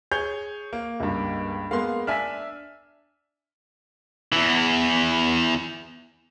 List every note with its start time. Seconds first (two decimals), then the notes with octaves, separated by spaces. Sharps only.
0.11 G#4 C#5 G6
0.73 A#3
1.00 C#2 G2
1.71 G#3 A#3 B3 F5 C6
2.07 D4 E5 G#5 F6 B6
4.32 E2 E3